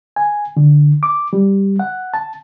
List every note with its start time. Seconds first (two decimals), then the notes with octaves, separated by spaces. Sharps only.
0.16 G#5
0.57 D3
1.03 D6
1.33 G3
1.80 F#5
2.14 A5